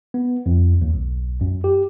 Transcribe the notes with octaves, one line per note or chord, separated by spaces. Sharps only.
B3
F2
D#2
B1
F#2
G4